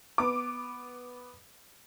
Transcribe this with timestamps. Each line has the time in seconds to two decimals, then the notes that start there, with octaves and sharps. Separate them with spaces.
0.18 B3 D6